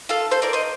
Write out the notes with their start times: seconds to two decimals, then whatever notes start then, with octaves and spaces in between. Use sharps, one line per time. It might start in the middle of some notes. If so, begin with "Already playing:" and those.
0.09 F4 A4
0.31 A4 C5
0.42 A#4 D5
0.53 C5 D#5